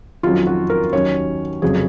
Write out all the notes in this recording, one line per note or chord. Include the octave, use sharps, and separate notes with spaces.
F2 D#3 F#3 C#4 F4
F#4
A#4
D#2 D#3 F#3 C#4 C#5
F1 F2 C#3 F#3 C#4 G#4